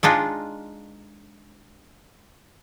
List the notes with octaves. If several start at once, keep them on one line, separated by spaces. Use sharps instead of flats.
G#3 D4 D#4 F4